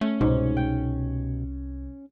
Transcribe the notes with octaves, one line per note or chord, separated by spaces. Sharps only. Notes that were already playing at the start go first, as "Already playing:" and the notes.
A3 C#4
C2 G#2 B2
G5